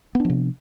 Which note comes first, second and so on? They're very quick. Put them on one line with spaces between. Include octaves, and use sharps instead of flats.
B3 D4 F3 C3